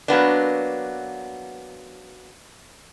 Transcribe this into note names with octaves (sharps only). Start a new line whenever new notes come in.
F#3 A#3 B3 D4